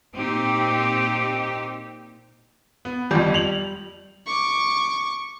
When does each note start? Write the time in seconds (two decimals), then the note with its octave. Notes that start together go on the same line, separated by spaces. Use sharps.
0.17 A#2 C4 D#4 G4
2.85 B3
3.11 G1 F2 G3
3.34 F7 F#7
4.27 C#6 D6